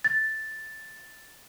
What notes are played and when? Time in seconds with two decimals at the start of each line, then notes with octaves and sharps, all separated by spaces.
0.05 A6